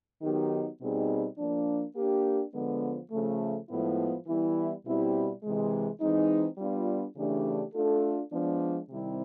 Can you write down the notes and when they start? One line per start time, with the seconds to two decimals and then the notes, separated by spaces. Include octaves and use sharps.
0.22 D#3 F#3 B3 D#4 G4
0.80 B2 G3 C4 D#4 G#4
1.37 F3 A#3 D4
1.95 A#3 D4 G4
2.53 D3 F3 G#3 B3
3.11 C#3 F3 A3
3.69 A2 F3 G#3 B3 E4
4.27 E3 G3 B3 E4
4.85 B2 G3 C4 E4 G4
5.43 C3 E3 G#3
6.00 E3 G#3 C4 D#4
6.58 G3 B3 D4 F4
7.16 C#3 E3 A3 D4 G4
7.74 A3 D4 F4 A4
8.32 F3 G#3 B3 D4
8.90 C3 D#3 G3 C4 E4